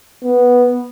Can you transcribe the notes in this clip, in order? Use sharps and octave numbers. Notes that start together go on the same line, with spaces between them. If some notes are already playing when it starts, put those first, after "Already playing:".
B3